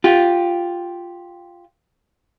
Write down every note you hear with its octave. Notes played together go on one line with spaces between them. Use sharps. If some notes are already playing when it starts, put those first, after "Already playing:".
F4 G4